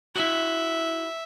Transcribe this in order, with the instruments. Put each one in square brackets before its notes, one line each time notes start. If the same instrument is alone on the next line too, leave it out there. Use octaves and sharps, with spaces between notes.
[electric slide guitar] E4 F#4 [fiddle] E5